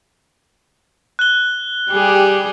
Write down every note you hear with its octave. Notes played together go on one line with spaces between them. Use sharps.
F#6 G7
G3 G4 G#4